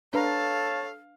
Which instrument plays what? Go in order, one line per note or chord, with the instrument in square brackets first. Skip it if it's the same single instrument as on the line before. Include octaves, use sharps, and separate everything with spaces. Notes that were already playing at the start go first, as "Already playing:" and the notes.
[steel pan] D4 B4 A#5 [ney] A4 [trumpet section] C#5 A5 [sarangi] F5